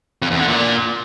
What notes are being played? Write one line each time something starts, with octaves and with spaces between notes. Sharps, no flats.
F2
E2
D3
A#2